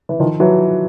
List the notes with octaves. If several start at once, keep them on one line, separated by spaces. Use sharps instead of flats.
E3
D#3 F3
E3 F#3